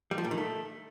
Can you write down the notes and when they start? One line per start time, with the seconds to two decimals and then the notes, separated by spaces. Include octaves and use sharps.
0.11 G3
0.18 F3
0.24 A#2
0.31 D#3
0.38 A3